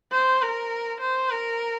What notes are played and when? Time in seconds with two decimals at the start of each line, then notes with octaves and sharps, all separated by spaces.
0.12 C5
0.42 A#4
1.01 C5
1.30 A#4